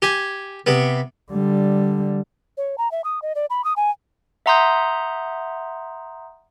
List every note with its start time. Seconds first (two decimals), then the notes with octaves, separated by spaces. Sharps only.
0.02 G4 G#5
0.66 C3 B3
1.32 D3 G3
2.57 C#5
2.78 A#5
2.92 E5
3.04 D#6
3.22 D#5
3.35 D5
3.50 B5
3.64 D#6
3.76 G#5
4.46 E5 F#5 A#5 C6 D#6 G6